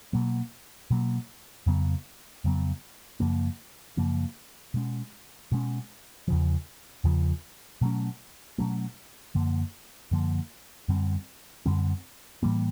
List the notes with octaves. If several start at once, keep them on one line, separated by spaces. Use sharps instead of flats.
B2 F#3 A#3
B2 F#3 A#3
F2 C#3 F#3 B3
F2 C#3 F#3 B3
F#2 C#3 F3 A#3
F#2 C#3 F3 A#3
B2 G#3 C#4
B2 G#3 C#4
E2 C#3 F3
E2 C#3 F3
B2 F#3 A3 C#4
B2 F#3 A3 C#4
F#2 D3 F3 A#3
F#2 D3 F3 A#3
F#2 D3 G3 C4
F#2 D3 G3 C4
A2 E3 G3 A#3